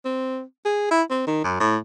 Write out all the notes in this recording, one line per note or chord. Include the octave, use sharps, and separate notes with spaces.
C4
G#4
E4
C4
D#3
F#2
A2